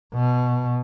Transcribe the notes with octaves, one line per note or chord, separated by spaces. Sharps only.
B2